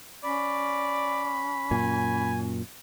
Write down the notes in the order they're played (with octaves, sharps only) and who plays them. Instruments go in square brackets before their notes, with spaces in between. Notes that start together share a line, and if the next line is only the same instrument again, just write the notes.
[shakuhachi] C#4 [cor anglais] D5 [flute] B5
[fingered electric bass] F#2 A#2 [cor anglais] G#5